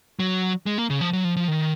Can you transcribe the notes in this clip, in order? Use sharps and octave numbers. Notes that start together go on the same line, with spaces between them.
F#3
G#3
A#3
C#3
F3
F#3
F3
F3
D#3